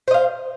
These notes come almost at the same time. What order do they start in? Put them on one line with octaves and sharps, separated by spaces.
C5 D#5 F5